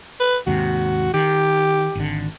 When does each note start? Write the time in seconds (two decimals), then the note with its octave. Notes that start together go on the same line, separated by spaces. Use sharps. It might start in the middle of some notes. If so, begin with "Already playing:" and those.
0.20 B4
0.47 D#2 G#2 C3 F#4
1.14 D#3 G4
1.95 G#1 D3